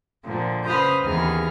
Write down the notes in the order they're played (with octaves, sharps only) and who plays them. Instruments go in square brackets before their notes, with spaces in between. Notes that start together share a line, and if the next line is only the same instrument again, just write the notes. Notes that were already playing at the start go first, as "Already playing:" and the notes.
[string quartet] A#2 D3 F3
C#3 B4 C5 D#6 F6 G6
D#2 E3 B3 G#4 A#5 F6